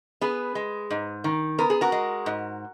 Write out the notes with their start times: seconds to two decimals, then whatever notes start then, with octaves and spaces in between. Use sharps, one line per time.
0.21 B3 G#4 B4
0.55 G#3
0.90 G#2
1.24 D#3
1.58 B3 A#4
1.70 G#4
1.81 F#4 A#4
1.92 G#3
2.26 G#2